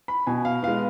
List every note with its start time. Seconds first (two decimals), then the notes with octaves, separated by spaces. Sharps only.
0.08 B5
0.27 B2 G#5
0.45 F5
0.63 G#3 B3 F5